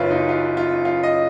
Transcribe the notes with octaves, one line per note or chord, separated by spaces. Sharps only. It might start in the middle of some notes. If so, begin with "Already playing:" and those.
Already playing: F#1 F#2 F4 B4 C#5
D#4
F4
F4
F4
D#5